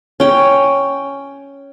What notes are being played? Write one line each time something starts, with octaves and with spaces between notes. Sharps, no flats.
C#4 G5